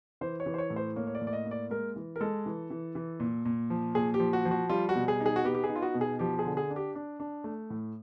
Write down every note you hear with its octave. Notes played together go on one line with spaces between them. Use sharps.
E3 C5
C#5
E3
C5
C#5
A2
C5
A#3 C#5
C#5
D5
A2
D5
D#5
A#3
D5
G#3 A#4
E3
A#4
G#3 A4
E3
E3
E3
A#2
A#2
F3
A#2 G#4
G4
F3
F#4
F3
F#4
G3 F4
F#4
B2
G#4
D#4
G#4
F#4
B3 G4
G4
G#4
D#4
F4
F#4
B2
G#4
F3 G4
G#4
D3
G#4
D4
G4
D4
D4
A3
A2